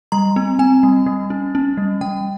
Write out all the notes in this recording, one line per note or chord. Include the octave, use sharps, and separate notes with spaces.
G3 A#5
C4
C4 G#5
G3
G3
C#4
C#4
G3
G3 G5